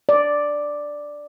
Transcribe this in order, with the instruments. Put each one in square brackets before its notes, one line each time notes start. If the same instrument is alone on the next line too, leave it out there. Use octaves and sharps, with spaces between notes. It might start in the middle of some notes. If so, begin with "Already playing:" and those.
[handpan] D5